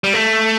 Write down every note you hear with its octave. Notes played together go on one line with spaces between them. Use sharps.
G3
A3